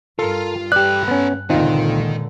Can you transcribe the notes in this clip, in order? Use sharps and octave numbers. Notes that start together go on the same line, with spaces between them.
G2 F4 A4 A#4
G4 A4 B4 D5 F#6
B3 C#4
C#2 A#2 D3 D#3 C4 D#4 F4